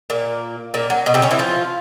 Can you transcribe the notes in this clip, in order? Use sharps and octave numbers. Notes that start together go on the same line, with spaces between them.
A#2 A#3
A#2 A#3
F#3
B2 B3
C3 C4
C#3 C#4
E3 E4
F3 F4